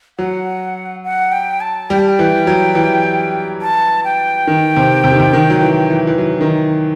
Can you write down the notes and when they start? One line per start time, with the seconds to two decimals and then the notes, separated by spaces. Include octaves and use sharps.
0.19 F#3 F#5
1.04 F#5
1.32 G5
1.61 A5
1.90 G3 G5
1.99 A5
2.09 G5
2.19 E3
2.47 F#3
2.75 E3
3.62 A5
4.04 G5
4.47 D#3
4.76 C3
5.04 C3
5.12 D#3
5.20 C3
5.33 D#3
5.50 F#3
5.61 E3
5.90 E3
6.07 E3
6.18 F#3
6.41 D#3